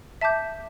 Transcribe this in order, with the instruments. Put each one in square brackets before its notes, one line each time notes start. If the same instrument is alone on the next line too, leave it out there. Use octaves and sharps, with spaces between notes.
[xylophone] E5 A5 D6 G6